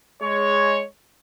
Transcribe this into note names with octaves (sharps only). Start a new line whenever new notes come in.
G#3 C#5